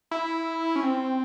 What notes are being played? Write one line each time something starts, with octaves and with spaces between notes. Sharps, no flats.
E4
C#4
C4